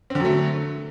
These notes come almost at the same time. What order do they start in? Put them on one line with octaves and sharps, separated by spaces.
C4 D3 F#3 A3